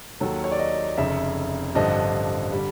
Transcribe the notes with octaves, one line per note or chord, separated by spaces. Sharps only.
D#2 D#3 F#3 A4
C#5
D5
D#5
F1 F2 C#3 E5
A1 G2 D3 F3 D#5
D3 G3